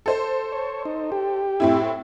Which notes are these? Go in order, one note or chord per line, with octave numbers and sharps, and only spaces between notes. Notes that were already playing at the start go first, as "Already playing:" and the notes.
A4 C5
C#5
D#4
G4
A2 C4 E4